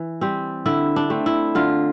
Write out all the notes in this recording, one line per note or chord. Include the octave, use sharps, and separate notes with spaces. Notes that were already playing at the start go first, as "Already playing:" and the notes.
Already playing: E3
G3 C4
D3 E4
D4
A3 C4
E4
D3 F4